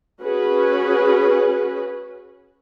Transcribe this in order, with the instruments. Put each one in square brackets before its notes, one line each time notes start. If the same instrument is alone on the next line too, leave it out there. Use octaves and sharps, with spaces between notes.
[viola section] C#4 F#4 G#4 B4